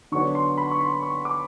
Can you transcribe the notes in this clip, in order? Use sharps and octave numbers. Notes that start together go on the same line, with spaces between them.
D3 F#3 B3 D4 C#6
C6
B5
C#6
C6
C#6
D6